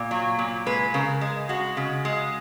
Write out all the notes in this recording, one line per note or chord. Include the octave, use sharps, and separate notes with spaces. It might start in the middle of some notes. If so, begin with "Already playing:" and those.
Already playing: A#2
F#3
A#2
G#3 B4
C#3 A#4
G#3
G#3 F#4
C#3
G#3